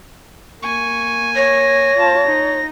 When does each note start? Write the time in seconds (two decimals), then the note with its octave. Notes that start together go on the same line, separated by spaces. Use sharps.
0.63 A#3 G#5 C#6
1.36 C#5 A#6
1.96 F4 A5
2.27 D#4